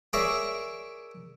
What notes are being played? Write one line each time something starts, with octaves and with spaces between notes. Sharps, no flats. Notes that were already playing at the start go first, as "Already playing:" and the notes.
G#4 A#4 C#5 D5 E5 C#6